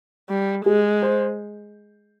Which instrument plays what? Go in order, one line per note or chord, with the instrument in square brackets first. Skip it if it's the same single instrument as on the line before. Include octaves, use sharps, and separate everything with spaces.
[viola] G3
[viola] G#3 [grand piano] G#4
[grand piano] C5